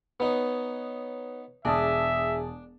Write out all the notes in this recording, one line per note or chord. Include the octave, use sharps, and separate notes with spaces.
B3 D#4 B4 C#5
E1 D4 G#4 E5 G#5 A5 D#6